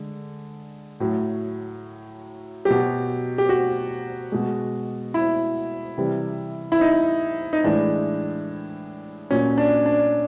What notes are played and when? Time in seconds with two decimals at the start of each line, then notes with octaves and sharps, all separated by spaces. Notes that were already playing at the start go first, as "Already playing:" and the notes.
Already playing: D3 G#3
1.00 A2 F#3
2.65 F#3 G4
2.70 B2
3.38 G4
3.49 F#4
4.32 B2 G#3
5.14 E4
5.98 C3 E3 G3
6.72 E4
6.81 D#4
7.53 D#4
7.64 A2 E3 G#3 D4
9.30 A#2 F#3 C#4
9.58 D4
9.86 D4